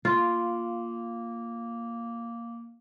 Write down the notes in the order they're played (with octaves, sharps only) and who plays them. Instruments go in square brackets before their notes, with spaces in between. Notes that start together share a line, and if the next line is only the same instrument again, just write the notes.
[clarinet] A#3 [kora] F4